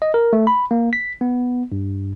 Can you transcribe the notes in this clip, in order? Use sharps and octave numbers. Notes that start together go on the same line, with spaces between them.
D#5
A#4
A3
B5
A#3
B6
B3
G2